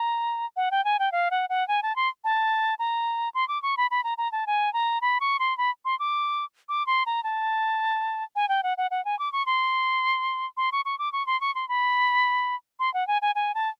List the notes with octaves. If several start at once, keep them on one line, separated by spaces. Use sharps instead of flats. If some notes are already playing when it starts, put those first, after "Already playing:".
Already playing: A#5
F#5
G5
G#5
G5
F5
F#5
F#5
G#5
A5
C6
A5
A#5
C6
D6
C#6
B5
B5
A#5
A#5
A5
G#5
A#5
B5
C#6
C6
B5
C6
D6
D6
C6
A#5
A5
G#5
G5
F#5
F#5
F#5
G#5
D6
C#6
C6
C6
C#6
C#6
D6
C#6
C6
C#6
C6
B5
C6
F#5
G#5
G#5
G#5
A5